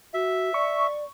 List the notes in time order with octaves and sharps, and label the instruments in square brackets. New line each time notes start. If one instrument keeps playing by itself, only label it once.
[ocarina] F#4 [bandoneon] E5
[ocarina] D5 [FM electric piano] C#6